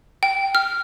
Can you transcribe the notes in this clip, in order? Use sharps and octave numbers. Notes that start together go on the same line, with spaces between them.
G5
F6